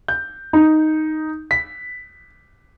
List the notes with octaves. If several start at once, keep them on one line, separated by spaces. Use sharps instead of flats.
G6
D#4
B6